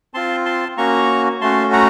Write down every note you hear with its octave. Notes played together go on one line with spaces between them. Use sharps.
C4 F4 A5 C6
A5 C6
A#3 C#4 F#4 A#5 C#6
A3 C#4 F#4 A5 C6
F#5 A#5